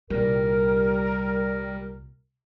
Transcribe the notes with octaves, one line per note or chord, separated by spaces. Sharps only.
C2 A#2 G3 A#4